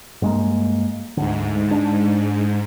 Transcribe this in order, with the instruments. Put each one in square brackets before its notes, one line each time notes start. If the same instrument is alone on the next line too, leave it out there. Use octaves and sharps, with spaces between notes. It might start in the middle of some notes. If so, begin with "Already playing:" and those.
[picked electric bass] G2 G#3 A#3
[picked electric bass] D2 D3 [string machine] G#2
[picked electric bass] D4